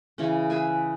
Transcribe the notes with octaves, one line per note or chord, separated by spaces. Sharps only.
C#3 E3 C#4
G#4 B4 E5 G#5